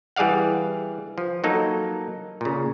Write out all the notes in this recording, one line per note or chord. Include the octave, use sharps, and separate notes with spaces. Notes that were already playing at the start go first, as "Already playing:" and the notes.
E3 G3 G#4 D5 F5 F#5
F3
F#3 A#3 D#4 A4
A#2 C#3